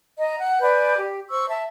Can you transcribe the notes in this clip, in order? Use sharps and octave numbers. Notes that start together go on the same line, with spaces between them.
D#5 A#5
F#5
B4 D5 G#5 G6
G4
C5 C#6 E6
E5 A5